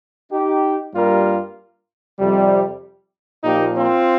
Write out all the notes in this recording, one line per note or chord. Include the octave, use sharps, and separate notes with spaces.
D#4 G4
G2 G3 A#3 F4 A#4
F2 C3 G3
A#2 F3 A#3 D#4 G4
C4 F4